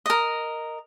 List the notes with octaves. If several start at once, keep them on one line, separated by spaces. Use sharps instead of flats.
A#4 D#5